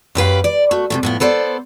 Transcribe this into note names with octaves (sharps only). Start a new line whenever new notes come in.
F#2 G4 B4 F5
D5
A3 F#4
C3 D#3 A3
A2 F3 B3
B3 A4 C5 D5